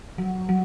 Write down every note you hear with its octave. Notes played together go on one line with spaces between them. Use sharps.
F#3
F#3